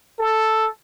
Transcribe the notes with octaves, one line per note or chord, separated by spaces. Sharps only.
A4